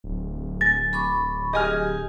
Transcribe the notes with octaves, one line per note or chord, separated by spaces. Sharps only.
D1
G#5 A6 A#6
B5 C#6 D6
G4 G#4 D#5 G#5 F6